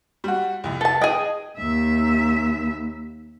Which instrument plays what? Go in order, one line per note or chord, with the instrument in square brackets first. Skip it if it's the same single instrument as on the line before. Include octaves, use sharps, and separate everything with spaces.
[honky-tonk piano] G3 F#4
C2 F2
[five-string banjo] A4 A5
[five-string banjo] G#4 D#5 [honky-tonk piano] G5 G#6 D#7
[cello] D#2 E5